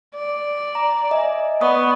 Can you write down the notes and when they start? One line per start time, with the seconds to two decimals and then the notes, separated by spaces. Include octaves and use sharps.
0.15 D5
0.75 A#5
1.11 D#5 E5 G#5
1.61 B3 D5 C#6 D#6